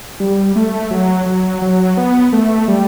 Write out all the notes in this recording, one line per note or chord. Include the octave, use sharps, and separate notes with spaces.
G3
A3
F#3
F#3
F#3
B3
A3
G3